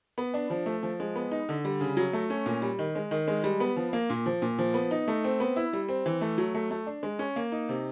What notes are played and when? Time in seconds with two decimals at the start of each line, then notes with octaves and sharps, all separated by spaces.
0.18 B3
0.34 D4
0.50 F3
0.66 A3
0.83 F3
1.00 G#3
1.16 B3
1.31 D#4
1.49 D3
1.65 G3
1.81 C#3
1.97 F#3
2.13 A3
2.30 C#4
2.46 A#2
2.62 G3
2.79 D#3
2.95 G#3
3.11 D#3
3.28 G#3
3.44 G3
3.60 B3
3.76 F3
3.93 A#3
4.10 A#2
4.26 F3
4.42 A#2
4.59 F3
4.74 B3
4.91 D#4
5.08 A3
5.24 C4
5.40 B3
5.56 E4
5.73 G3
5.89 C4
6.06 E3
6.21 A3
6.38 F#3
6.55 A3
6.71 A3
6.87 D4
7.03 G#3
7.19 C#4
7.36 A#3
7.52 D#4
7.69 C3